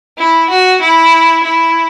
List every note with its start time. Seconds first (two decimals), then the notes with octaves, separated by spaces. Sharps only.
0.18 E4
0.50 F#4
0.81 E4
1.43 E4